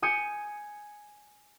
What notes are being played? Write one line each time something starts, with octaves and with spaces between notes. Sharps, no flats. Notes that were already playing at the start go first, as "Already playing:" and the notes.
G#5 D#6 G6 C#7